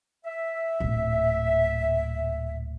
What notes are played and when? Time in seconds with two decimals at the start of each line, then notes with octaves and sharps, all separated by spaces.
0.25 E5
0.80 D1 A#2